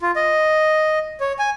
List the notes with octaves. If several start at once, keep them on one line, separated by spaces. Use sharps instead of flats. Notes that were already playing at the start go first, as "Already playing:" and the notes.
F4
D#5
C#5
G#5